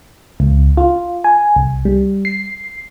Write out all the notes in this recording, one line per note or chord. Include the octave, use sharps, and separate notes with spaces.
C#2
F4
G#5
C2
G3
C7